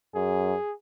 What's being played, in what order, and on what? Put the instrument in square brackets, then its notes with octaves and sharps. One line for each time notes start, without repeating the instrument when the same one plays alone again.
[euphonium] F#2 [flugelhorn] G#4